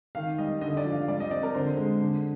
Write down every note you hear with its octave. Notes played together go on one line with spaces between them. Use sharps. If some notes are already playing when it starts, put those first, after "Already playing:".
D#3 F5
G3 D#5
D3 D#5
D5
F3
F5
G3 D5
D#5
C4 D5
A#4
D3 C5
G#3
D3